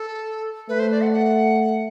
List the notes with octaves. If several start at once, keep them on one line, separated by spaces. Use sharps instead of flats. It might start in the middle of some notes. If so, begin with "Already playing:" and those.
Already playing: A4
A3 B4
C5
D5
F#5
F#5